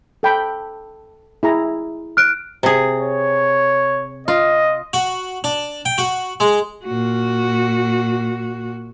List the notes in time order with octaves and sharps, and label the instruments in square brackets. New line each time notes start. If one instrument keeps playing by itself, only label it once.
[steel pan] A4 G5 B5
E4 G#4 A#5
[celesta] F6 F#6 D7
[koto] C3 G#4
[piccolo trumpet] C#5
[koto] F4 [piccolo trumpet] D#5
[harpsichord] F#4
D4
G5
F#4
G#3
[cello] A#2 F#4